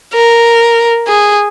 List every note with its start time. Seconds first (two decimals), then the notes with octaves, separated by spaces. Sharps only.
0.14 A#4
1.07 G#4